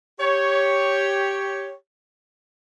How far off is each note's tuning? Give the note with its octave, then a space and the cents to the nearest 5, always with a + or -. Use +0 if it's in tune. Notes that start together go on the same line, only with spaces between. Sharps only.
G4 +0 C#5 +5